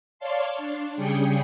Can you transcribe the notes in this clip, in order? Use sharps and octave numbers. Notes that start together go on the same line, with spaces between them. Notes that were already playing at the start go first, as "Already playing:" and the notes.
C#5 D5 F5 A5 C6
D4
C#3 G3 G#4 G5 C#7